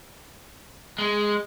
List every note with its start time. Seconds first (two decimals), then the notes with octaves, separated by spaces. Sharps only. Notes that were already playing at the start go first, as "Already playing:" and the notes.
0.98 G#3